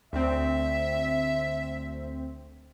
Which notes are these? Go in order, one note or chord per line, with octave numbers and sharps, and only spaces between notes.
D2 C4 E5